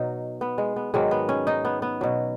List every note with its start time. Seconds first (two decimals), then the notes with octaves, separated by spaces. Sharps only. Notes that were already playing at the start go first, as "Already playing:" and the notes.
Already playing: B2 F#3 D#4 F#4
0.41 B3
0.58 G#3
0.76 B3
0.94 G#2 D#3 F#3 G#3
1.11 B3
1.29 C#4
1.47 D#4
1.65 B3
1.82 B3
2.01 B2 F#3